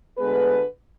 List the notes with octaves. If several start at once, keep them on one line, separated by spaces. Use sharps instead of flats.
D2 D3 G#3 B3 G#4 B4